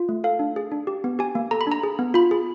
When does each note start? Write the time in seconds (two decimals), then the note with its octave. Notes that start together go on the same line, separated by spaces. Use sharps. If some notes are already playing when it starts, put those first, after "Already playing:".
Already playing: F4
0.09 A3
0.24 A4 F5
0.39 D4
0.56 G#4
0.72 D4
0.87 G4
1.04 B3
1.19 G4 G#5
1.35 A#3
1.51 A4 A#5
1.61 B5
1.67 D4 A#5
1.83 G#4
1.99 B3
2.14 F4 B5
2.31 G#4